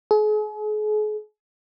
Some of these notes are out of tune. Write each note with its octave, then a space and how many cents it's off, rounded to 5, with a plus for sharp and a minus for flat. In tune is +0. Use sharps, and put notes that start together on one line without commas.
G#4 +40